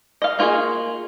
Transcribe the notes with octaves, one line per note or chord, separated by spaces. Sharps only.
D#5 F5
A#3 F4 F#4 G#4